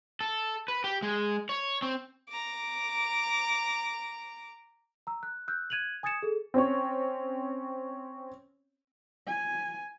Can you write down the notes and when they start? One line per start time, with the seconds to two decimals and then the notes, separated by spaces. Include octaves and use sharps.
0.21 A4
0.68 B4
0.84 G4
1.02 G#3
1.49 C#5
1.82 C4
2.29 A#5 D6
5.07 A#5 E6
5.23 F#6
5.48 E6 F#6 G6
5.70 F#6 G#6 D#7 F7 F#7
6.03 G#5 D#6 G#6 A6 C#7 E7
6.23 G#4 A4
6.54 C4 C#4 C#5
9.27 G#5